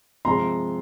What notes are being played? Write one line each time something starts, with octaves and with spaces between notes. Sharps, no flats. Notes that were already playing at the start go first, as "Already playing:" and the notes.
C3 F3 G#3 A#5 C6